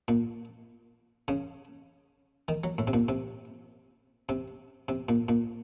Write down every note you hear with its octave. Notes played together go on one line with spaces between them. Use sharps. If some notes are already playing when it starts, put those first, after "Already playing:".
A#2
C#3
D#3
F#3
A2
C3
A#2
C3
C3
C3
A#2
A#2